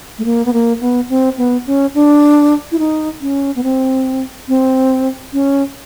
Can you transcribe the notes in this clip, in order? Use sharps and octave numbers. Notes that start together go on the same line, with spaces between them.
A3
A#3
B3
A#3
B3
C4
B3
C#4
D4
E4
D#4
C#4
B3
C4
C4
C#4